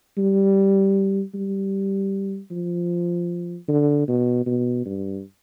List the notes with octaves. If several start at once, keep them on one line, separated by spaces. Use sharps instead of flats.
G3
G3
F3
D3
B2
B2
G2